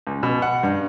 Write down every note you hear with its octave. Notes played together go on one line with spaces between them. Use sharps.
C#2
B2
F#5
G2